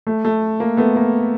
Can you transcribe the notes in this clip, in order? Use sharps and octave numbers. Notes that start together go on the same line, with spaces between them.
A3
A3
A#3
A3 B3
A#3